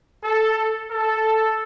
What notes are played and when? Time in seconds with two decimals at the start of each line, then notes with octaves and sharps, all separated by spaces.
0.23 A4
0.91 A4